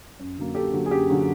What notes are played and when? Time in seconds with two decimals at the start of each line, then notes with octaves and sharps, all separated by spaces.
0.19 F#2
0.38 D3 F#3 A#3
0.55 F#2 G4 A4
0.73 D3 F#3 A#3
0.86 G#4
0.91 F#2 G4
1.09 D3 F#3 A#3